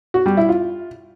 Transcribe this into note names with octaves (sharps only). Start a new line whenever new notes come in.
F#4
G3
E4
F4